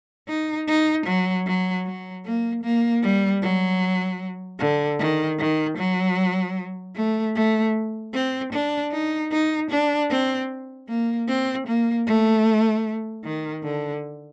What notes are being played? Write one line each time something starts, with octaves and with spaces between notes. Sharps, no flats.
D#4
D#4
F#3
F#3
F#3
A#3
A#3
G3
F#3
D3
D#3
D#3
F#3
A3
A3
C4
D4
D#4
D#4
D4
C4
A#3
C4
A#3
A3
D#3
D3